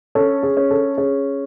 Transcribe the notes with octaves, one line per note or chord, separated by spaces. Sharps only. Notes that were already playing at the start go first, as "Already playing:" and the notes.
C#4 A4
G#4
C#4
A4
C#4 G#4